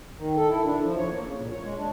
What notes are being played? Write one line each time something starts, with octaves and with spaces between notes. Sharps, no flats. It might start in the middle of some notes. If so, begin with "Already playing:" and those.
D#3
A4
E4
D4
F3
C#5
A#3
C#3
A#2
C#5
G#3
D4